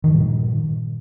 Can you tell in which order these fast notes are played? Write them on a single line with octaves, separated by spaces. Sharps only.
D#3 G2 F3 A#2